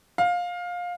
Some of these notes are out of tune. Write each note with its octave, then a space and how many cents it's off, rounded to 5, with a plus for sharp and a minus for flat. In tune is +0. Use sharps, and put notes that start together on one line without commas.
F5 +20